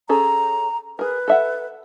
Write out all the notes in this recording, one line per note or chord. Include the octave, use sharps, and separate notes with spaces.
C#4 G#4 A4 A#5
G#4 A#4 B4
A4 E5 F#5